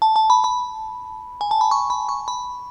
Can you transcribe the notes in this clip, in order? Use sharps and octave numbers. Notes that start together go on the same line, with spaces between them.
A5
A5
B5
B5
G#5
A5
B5
C#6
B5
C#6
B5